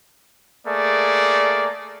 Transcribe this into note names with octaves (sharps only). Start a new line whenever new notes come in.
A3 A#3 G#4 D5